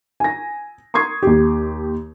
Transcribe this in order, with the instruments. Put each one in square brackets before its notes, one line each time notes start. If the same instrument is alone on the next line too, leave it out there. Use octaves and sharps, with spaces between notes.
[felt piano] G#5 A#6
C6 C#6 D#6 G#6 C7
D#2 G4